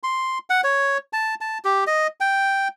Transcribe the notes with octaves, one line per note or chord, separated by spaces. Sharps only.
C6
F#5
C#5
A5
A5
G4
D#5
G5